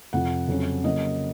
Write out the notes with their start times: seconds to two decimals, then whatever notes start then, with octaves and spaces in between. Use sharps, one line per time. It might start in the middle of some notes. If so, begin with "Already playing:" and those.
0.13 F2 C3 F3 F#5
0.48 F2 C#3 F#3 C#4
0.84 C#3 F#3 A#3 D#5